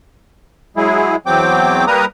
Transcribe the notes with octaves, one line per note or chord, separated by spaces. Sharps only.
F#3 G#3 E4 G#4
E2 F#3 C4 G5 D6
G3 A#3 A#4 B4 A#5 D#6